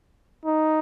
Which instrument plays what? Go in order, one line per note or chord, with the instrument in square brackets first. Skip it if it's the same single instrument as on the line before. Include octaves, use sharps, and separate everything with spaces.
[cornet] D#4